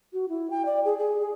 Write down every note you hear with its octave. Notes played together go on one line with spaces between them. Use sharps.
F#4
E4
G5
D5
G#4
G#4
G#4